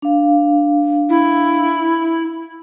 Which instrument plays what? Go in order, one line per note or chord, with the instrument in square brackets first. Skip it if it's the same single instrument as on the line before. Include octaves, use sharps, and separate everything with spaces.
[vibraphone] D4 F5
[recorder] E4